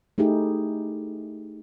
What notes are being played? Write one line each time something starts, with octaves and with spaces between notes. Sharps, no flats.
A3 D#4 E4 G4 G#4